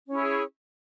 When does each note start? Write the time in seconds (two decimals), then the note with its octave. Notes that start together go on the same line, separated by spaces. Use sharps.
0.07 C#4
0.11 E4
0.15 G#4